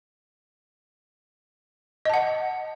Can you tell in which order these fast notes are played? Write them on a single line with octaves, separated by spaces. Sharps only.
D#5 A5 F#5